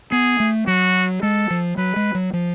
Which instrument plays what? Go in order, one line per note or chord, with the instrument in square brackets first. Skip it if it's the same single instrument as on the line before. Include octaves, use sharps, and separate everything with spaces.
[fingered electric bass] B3 [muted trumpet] G#4
[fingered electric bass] A3
[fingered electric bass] F#3 [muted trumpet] F#4
[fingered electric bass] G#3 [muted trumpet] A4
[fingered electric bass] F3
[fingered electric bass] F#3 [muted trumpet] B4
[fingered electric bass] G#3
F#3
F3